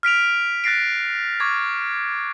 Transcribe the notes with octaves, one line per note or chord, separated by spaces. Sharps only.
F6 B6 D7 F7
F#6 A6 A#6 C7 D7
C#6 D6 G#6